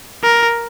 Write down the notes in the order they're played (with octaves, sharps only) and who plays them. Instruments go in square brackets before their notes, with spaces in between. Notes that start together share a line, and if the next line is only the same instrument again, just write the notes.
[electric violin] A#4